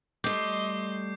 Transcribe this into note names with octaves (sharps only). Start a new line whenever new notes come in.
G3 A3 D#5 C6 D6 G6 C7